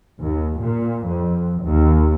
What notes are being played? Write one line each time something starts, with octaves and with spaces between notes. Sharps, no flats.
D#2
A#2
F2
D#2